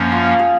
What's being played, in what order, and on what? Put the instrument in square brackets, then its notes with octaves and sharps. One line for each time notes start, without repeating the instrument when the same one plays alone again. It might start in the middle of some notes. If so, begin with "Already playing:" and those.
Already playing: [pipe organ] F#2 F3 A#3 C#4
[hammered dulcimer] F4
G#4